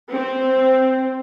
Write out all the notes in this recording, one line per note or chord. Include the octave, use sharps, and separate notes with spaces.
C4